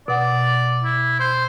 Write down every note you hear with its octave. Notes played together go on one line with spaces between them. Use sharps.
B2 D5 F#5
E4
C5